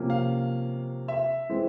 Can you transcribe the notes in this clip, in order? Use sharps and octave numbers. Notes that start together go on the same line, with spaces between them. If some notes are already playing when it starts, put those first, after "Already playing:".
Already playing: C3 F3 A#3 C#4
F5
E5
E3 G#3 C4